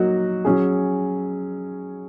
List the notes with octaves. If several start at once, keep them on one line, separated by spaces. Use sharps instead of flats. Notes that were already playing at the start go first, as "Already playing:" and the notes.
Already playing: F#3 A#3 D#4 F#4
F#3 C#4 G#4